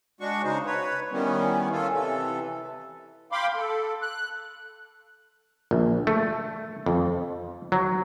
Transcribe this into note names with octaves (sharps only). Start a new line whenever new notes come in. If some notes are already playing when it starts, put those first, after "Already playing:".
G#3 D4 F#4 C#6
C#3 D#4 C5
B4 C#5
D#3 E3 G3 B3 C#4
C#4 F4 A4
C3 E3 A4
F5 G5 B5 C6 D6
A4
F#6
A#1
A3
F2
F#3